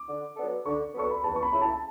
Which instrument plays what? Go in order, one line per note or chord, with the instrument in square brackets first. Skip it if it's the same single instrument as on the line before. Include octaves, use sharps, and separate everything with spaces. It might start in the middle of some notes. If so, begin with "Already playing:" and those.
Already playing: [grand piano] D6
[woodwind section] D3
F#3 B3 D4 A4
[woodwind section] D3 [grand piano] C#6
[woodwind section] F#3 B3 D4 A4 [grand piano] C#6
[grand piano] B5
[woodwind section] E2 [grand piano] A5
[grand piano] C#6
B5
[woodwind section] C#3 F#3 A3 E4
[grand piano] A5